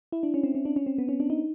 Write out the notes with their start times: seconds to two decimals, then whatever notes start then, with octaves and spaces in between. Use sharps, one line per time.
0.12 E4
0.23 D4
0.34 C#4
0.43 C4
0.55 C#4
0.65 D4
0.76 C#4
0.86 C4
0.98 B3
1.09 C#4
1.20 D4
1.30 D#4